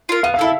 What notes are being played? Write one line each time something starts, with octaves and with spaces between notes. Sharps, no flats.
F4 A#4
B3 F5
F5
E4 A4 E5